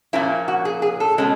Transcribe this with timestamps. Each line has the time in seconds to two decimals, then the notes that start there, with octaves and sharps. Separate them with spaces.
0.13 A#2 F3 A#3 C#4 E4
0.48 F#4
0.65 G#4
0.82 G#4
1.00 A4
1.18 B2 G#3 C#4